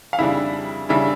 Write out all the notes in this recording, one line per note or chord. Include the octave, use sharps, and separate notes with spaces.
F5
F2 C#3 G3 D4 E4 E5
C#3 G3 D4 E4 E5